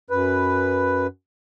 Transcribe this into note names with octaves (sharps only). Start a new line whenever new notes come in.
F#2 B4